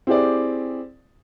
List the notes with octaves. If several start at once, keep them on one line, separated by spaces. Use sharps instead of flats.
C4 E4 G4 G#4 D5